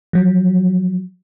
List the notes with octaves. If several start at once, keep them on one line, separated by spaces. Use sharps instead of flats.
F3 F#3